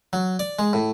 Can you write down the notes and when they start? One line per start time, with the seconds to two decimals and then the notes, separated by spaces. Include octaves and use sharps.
0.13 F#3
0.39 D5
0.59 G#3
0.73 A2